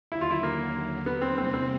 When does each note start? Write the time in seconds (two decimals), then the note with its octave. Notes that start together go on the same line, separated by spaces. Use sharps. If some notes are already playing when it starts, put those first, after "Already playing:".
0.12 D#2 D3 F#3 E4
0.21 F4
0.31 E4
0.43 A#3
1.06 B3
1.21 C4
1.37 E2 C3 E3 G3 A#3 C4
1.54 C4